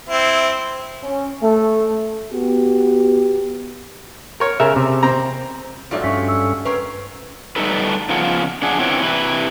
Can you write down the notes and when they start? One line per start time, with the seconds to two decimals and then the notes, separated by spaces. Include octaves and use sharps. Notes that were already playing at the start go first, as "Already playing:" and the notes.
0.09 C4 E4
1.03 C#4
1.41 A3
2.32 B3 F#4 G4
4.40 A#4 C#5
4.60 C#3 A#4 E5
4.76 C3
5.03 C4 A#5
5.91 F2 G#2 F#3 A3 D4 F4
6.04 G2 C#4 C#6 B6
6.28 E6
6.65 C4 C#4 A#4 B4 C#6
7.56 G3 A3 A#3 D#4 A4 B4
8.09 C#3 F3 B3 F4 G#4 F#5
8.62 F#2 D4 G#4 F#5
8.79 C4 E4 B4 C#5 G5
9.02 C3 E4 B4